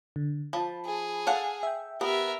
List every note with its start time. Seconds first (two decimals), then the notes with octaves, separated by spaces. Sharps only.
0.16 D3
0.53 F3 A5 B5
0.85 G#4
1.27 A4 F5 F#5
1.63 E5 G5
2.01 B3 G4 A#4 E5